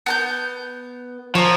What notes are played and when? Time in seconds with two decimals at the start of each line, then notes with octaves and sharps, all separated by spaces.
0.06 B3 A5 G6
1.35 F3 C#5 A#5